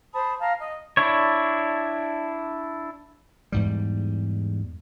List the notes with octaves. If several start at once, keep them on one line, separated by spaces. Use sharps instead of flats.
C5 A5 B5 D#6
F5 A5 A#5
D#5
D4 E4 C#5
E2 G#2 G3